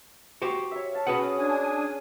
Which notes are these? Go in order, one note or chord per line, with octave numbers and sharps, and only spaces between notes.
F#4 G4 C5
C#5 E5
F5 A5
C#4 F#4 G#4 B4 F#5 D#6
D4 G#5 D#6